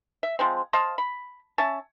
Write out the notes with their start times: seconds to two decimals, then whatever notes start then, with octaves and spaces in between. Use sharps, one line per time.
0.23 E5
0.39 F3 G#3 C4
0.73 C5 D#5 F5 A5
0.98 B5
1.58 C#4 E5 A5